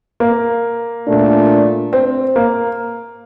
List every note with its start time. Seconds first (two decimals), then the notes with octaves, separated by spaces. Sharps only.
0.20 A#3
1.06 A#2 A3 D4
1.93 C4
2.36 A#3